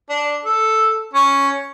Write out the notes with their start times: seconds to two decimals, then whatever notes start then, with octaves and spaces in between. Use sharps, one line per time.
0.10 D4
0.45 A4
1.13 C#4